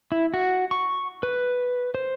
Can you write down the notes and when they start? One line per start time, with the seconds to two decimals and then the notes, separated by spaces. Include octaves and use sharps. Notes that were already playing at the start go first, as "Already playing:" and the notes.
0.12 E4
0.34 F#4
0.71 C#6
1.23 B4
1.95 C5